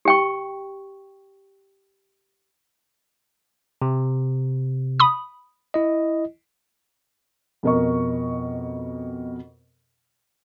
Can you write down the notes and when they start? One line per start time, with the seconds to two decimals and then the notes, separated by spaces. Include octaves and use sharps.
0.05 G4 G5 C#6
3.82 C3
5.00 B5 D#6
5.74 E4 D#5
7.63 F2 B2 A#4 D#5 C#6